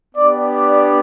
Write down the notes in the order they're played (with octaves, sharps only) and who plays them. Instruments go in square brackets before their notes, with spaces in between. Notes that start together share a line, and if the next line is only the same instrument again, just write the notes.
[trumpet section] B3 D4 G4 D5
D5